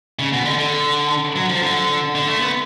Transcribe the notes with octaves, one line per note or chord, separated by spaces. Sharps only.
C#3
B2
D3
D3
F#3
F3
D3
D3
A3
B3